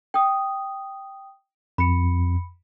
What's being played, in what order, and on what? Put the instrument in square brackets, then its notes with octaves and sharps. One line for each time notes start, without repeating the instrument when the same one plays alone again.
[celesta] G5 D#6
[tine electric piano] F2 [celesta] B5 C#7